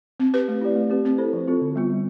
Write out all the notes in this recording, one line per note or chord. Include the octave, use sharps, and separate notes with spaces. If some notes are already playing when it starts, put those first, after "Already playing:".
C4
G4 B4
A3
E4 G4 D5
A3
C4 G4 B4
C4
E4 A4 C5
F3
C4 F4 A4
D3
G3 B3 F4
G3